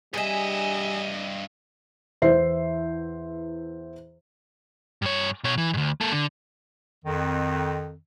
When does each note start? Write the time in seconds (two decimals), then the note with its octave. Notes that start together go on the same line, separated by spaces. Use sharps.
0.14 G2 G3 G#4 D#5 E5 G#5
2.22 E2 E3 C5 E5 C7
5.02 G2 C#5
5.44 B2 C#5
5.58 E3
5.73 D2 G2
6.01 A#3 A4
6.12 D3
7.05 F2 D#3